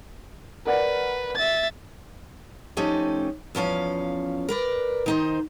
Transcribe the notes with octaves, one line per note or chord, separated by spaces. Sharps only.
A#4 B4 D5 F#5
E5 A6
F3 A3 C#4 D#4 G4
E2 F3 C#4 F5
A#4 B4 D5
D#3 D#4 C5